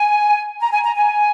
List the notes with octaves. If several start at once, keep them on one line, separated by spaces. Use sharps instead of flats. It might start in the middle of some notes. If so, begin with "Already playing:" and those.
Already playing: G#5
A#5
G#5
A#5
G#5